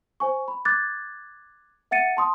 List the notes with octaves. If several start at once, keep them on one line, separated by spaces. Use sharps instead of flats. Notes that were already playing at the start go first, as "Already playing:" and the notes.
C5 G#5 C#6
B5
D6 F#6 G#6 A6
E5 F#5 A6 C#7 D#7
A5 C6 D#6